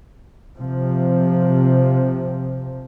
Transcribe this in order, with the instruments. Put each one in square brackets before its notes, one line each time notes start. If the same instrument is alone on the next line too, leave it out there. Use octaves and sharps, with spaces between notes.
[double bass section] C3 F3